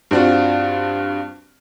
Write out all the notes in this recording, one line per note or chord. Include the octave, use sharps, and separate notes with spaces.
G2 C4 D4 F4 F#4